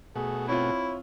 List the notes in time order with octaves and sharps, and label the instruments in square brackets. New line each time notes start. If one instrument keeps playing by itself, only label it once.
[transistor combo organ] B2 A3 F#4 [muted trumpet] G#4
[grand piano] C4 F4 [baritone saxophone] E4 [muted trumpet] C#5